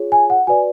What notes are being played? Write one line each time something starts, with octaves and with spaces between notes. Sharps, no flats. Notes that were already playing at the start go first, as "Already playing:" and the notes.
Already playing: F4 G#4 C#5
G#5
F#5
F#4 B4 D5 G#5